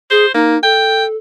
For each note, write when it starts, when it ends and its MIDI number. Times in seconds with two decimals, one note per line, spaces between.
0.11 0.26 68
0.11 0.32 72
0.34 0.56 58
0.34 0.58 63
0.63 1.16 69
0.63 1.04 79